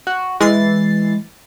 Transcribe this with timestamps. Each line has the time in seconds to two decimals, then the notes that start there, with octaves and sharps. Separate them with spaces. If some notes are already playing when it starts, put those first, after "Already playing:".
0.07 F#4
0.40 E3 G#3 A6 C7